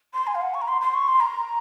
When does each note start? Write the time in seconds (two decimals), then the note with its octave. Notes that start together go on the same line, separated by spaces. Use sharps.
0.14 C6
0.27 G#5
0.35 F5
0.41 F#5
0.54 C#6
0.61 A#5
0.68 C6
0.81 C6
0.94 C#6
1.08 C6
1.20 A#5